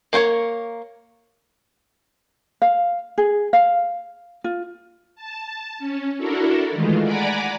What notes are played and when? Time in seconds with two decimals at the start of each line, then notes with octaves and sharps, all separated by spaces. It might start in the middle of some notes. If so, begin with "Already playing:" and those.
0.13 A#3 A#4 C5 C#5
2.62 F5
3.18 G#4
3.53 F5
4.44 F4
5.15 A5
5.78 C#4
6.18 D4 E4 F#4 A4 A#4
6.71 D#3 E3 G#3 A3 F4
7.02 D5 F#5 G#5 A#5 B5 D6